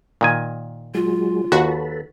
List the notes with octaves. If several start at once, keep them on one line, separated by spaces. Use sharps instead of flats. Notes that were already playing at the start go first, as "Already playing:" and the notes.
A#2 D#3 G#5
F#3 G#3 F4
D#2 F#4 A4 B4